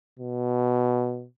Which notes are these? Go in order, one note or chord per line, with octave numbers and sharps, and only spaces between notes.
B2